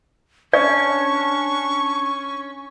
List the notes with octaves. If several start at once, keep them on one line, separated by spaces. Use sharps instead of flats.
C#4 D4 D5 C#6